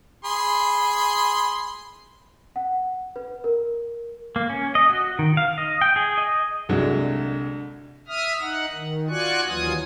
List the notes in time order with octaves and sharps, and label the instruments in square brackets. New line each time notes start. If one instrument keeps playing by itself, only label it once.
[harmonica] G#4 B5 C6
[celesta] F#5
B4
A#4
[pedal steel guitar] A#3
C#4
D#5
F#4
D#3
F5
D#5
G5
G#4
D#5
[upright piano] C2 D3 F#3 G#3
[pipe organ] E5 D#6 F6
D#4 F#5
D#3
F4 F#4 D5 G#5 C#6 F#6
D#2 E3 F#3 F4 G#5 D#6